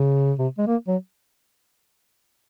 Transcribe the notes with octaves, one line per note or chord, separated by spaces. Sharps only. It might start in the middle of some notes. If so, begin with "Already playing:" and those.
Already playing: C#3
C3
G#3
A#3
F#3